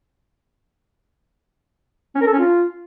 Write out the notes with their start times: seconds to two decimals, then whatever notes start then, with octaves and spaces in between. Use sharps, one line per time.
2.15 C#4
2.21 A#4
2.27 A4
2.33 C#4
2.39 F4